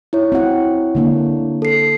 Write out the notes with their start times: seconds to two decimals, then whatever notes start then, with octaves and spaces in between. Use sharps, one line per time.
0.13 E4 C#5
0.32 C4 F#4 F#5
0.95 D3 A#3 D4
1.62 A4 C7